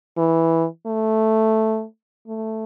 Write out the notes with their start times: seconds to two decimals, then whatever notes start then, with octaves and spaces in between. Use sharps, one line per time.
0.17 E3
0.86 A3
2.27 A3